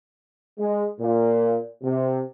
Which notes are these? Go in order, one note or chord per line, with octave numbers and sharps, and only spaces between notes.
G#3
A#2
C3